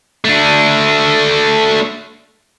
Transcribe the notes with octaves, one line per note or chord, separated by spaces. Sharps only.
A3 D4